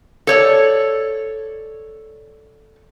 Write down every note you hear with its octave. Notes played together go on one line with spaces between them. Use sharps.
A4 C#5 D5